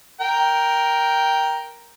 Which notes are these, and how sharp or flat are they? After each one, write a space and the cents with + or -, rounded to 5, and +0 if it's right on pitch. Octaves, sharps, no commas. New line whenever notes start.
A#4 +5 G5 +0